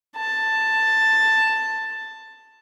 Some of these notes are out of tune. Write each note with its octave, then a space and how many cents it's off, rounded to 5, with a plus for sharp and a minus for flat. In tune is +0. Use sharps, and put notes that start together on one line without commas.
A5 +5